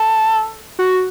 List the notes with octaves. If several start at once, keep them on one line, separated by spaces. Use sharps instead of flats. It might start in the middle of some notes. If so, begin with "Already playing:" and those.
Already playing: A4
F#4